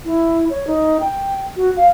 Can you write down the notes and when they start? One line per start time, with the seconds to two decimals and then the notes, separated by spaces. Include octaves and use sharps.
0.05 E4
0.50 C#5
0.67 D#4
1.00 G5
1.56 F#4
1.77 F5